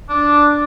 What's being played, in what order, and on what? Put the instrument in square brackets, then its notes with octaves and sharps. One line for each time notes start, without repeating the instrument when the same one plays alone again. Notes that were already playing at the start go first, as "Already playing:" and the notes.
[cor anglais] D4